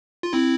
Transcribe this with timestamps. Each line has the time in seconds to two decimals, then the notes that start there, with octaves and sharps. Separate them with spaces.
0.23 F4
0.33 C4 E4